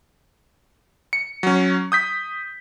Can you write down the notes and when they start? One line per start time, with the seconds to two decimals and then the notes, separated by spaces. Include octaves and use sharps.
1.13 C#7
1.43 F#3 C#4
1.92 D#6 G6 B6